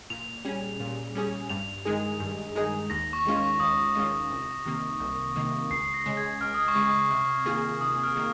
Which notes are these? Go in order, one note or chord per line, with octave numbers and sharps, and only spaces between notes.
A#2 F7
G3 C#4 G#4
A#2
G3 C#4 G#4
G2 F7
D#3 G#3 D#4 G#4
G2
D#3 G#3 D#4 G#4
D#2 A#6
C#6
D#3 G#3 C#4 F4
C#6
D#2 D#6
D#3 G#3 C#4 F4
C2
C3 D#3 A#3
C2
C3 D#3 A#3
C#2 C7
A#6
C#3 G#3
G#6
C#2 F6
D#6
C#6
C#3 G#3
D#6
C3
D#3 A#3 F4 G#4
C3 D#6
F6
D#3 A#3